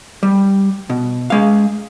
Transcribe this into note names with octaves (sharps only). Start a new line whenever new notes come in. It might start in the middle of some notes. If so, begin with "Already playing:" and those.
G3
B2
G#3 F5